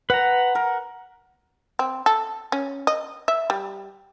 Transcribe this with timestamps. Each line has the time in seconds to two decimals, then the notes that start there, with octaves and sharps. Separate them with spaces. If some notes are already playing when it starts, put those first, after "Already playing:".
0.10 B4 F#5 A#5
0.55 A#4
1.79 C4
2.06 A4
2.52 C#4
2.87 D#5
3.28 E5
3.50 G3